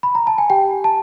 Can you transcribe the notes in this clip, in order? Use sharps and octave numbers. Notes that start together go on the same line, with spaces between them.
B5
A#5
A5
G#5
G4 G5
A5